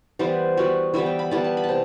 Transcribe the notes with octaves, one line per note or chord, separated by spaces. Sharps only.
E3 G3 B3 C5
E3 G3 B3 F#4
E3 G3 B3 E5
G5
B5
E3 G3 B3 A5
A5
B5
A5
C3